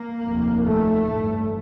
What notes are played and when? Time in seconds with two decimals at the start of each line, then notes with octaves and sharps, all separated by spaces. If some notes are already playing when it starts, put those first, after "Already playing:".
Already playing: A#3
0.24 F1 D#2
0.65 A3
1.04 A1 G2